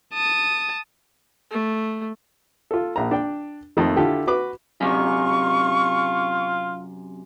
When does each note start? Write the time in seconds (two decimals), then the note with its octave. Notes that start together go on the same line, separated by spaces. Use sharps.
0.14 A5 D#6
1.51 A3
2.71 F4 A4
2.96 A#1 A#5
3.11 D4 G5
3.77 F2 D#3 A3
3.97 D3 E4 F4 G4 A4
4.27 F#4 B4 D6
4.81 F#2 C3 F4 C#6